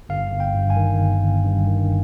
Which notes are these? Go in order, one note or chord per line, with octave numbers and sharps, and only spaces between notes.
G1 F5
G1
G5
G2
G#5
D#3
G1
G1
G2
D#3